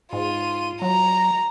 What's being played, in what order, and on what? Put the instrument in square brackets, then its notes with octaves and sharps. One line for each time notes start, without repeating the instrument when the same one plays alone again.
[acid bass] G#2 [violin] F4 D#7
[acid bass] F#3 [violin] A#5